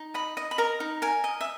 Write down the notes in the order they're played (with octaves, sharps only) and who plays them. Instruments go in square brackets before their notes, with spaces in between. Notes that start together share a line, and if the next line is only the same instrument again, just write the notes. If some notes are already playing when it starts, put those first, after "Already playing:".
Already playing: [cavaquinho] D#4
D#5 B5
D#5
B5
A#4 A#5
D#4
A#4 G#5
D#5
E5